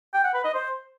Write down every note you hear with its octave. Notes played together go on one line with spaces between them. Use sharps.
G5
F#5
B4
D#5
C5